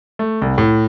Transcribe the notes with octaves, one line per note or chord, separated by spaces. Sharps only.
A3
C2
A2